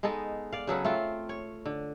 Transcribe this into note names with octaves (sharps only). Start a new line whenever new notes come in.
G#3 B3 D#4 A4
D5 F5
C#3 F#3 A4 B4
A3 C4 F4
C#5
D3